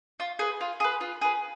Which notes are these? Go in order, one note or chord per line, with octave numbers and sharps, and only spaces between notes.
F4
G#4 B4
F4
G#4 B4
F4
G#4 B4